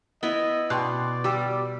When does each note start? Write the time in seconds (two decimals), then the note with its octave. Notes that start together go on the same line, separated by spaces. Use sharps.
0.23 B3 E4 D#5
0.70 B2 D5 G5 C6 F#6
1.24 G3 G4 D6 E6